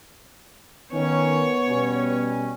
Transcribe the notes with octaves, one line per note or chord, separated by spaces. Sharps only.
D#3 B3 C#4 C#5
B2 G3 C#4